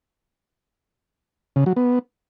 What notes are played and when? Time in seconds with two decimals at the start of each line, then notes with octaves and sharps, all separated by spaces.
1.56 C#3
1.66 F#3
1.76 B3